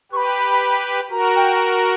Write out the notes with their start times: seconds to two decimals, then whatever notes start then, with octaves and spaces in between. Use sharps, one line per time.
0.12 G4 B4 C#6
0.16 B5
1.10 F#4 A#4 A#5
1.35 G5